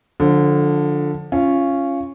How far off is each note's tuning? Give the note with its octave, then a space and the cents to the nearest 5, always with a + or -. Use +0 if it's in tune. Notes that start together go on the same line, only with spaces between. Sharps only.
D3 +0 F3 +20
C#4 -5 F4 -20